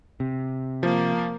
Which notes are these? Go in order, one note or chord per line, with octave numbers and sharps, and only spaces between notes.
C3
F3 A#3